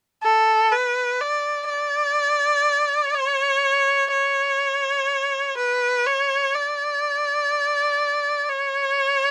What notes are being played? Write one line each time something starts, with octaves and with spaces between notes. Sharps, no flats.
A4
B4
D5
D5
C#5
C#5
B4
C#5
D5
C#5